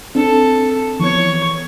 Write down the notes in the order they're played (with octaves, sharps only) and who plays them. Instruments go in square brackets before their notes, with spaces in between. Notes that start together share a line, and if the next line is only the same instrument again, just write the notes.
[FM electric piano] C4 D4 [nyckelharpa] A4
[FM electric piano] E3 F3 B3 [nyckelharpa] C#5 C#6